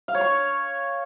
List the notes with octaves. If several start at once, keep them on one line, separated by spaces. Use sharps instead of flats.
F5
C#5
C#6